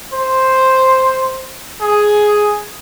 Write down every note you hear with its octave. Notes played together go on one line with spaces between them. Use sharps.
C5
G#4